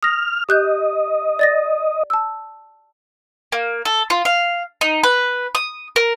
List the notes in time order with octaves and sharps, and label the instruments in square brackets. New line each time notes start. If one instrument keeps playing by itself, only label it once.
[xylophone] D#6 A#6 [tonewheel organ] F6
[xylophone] G4 F#6 G6 [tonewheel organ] D#5
[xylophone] D5 A6 A#6
A5 E6
[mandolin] A#3
A4
F4
F5
D#4
B4
D#6
A#4